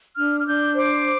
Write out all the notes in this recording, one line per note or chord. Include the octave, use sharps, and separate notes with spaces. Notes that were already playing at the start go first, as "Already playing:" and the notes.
D4 F6
F6
D4 G6
C5 D6